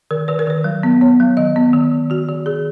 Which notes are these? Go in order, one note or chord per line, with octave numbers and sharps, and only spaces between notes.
D#3 A#4
D#3 B4
A#4
D#3 B4
F#3
B3
B3 C#5
F#3
D#3 D#5
B3
D#3
D#3
D#3 F#4
D#3
D#3 G#4